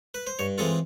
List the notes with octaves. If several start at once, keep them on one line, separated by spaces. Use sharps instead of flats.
B4
C5
G2 C#5
E3 G#3 C4 F4 A4